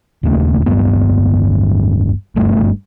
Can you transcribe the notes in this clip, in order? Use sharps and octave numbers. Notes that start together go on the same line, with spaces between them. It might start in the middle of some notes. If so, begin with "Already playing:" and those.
E1 D#2 C#3 A3
D1 G1 G2 B3
F#1 G2 A3